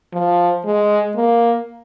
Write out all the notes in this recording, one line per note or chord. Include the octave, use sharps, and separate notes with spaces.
F3
G#3
A#3